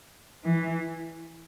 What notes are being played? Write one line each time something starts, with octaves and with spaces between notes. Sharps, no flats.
E3